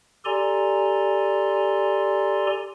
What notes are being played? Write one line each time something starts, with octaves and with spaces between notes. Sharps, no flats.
G4 A4 D5 G#5 A#5 C6